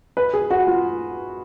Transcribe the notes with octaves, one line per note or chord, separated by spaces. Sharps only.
B4
G#4
F#4
F4